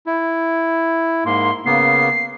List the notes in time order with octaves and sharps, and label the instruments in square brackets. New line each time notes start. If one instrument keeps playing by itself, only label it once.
[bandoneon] E4
[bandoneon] G#2 A#3 [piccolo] C6
[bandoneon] C#3 A#3 B3 [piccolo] C7